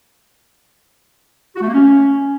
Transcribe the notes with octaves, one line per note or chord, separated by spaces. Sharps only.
F#4
A3
A#3
C#4